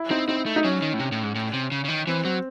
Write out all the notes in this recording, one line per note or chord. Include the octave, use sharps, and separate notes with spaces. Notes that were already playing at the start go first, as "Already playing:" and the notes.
Already playing: E4
C4 D#4
C4 D#4
A3
D#4
F#3 C#4
D#3
A2
C3
A2
G#2
A2
C3
C#3
C#3
D#3
E3 C4
F#3 C4